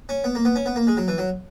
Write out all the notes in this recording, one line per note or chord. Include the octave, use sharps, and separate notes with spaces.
C#4
B3
A#3
B3
C#4
B3
A#3
G#3
F#3
E3
F#3